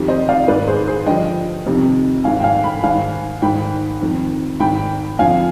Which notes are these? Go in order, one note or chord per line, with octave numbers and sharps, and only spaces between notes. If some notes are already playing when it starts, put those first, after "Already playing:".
Already playing: F2 D#3 G4
C5 D#5
D5 F5
G#2 D#3 B4 D5
G#4 C5
G#4 C5
G2 D3 F3 D#5 G5
F2 C3 D#3
G#2 D#3 F5 G#5
G5
F5 G#5
G5 B5
G#2 D#3 F5 G#5
G#2 D#3 G5 B5
F2 D#3
G#2 D#3 G5 B5
F2 D3 F3 F5 G#5